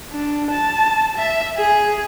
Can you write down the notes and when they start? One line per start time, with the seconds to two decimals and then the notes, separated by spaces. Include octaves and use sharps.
0.13 D4
0.51 A5
1.18 E5
1.57 G#4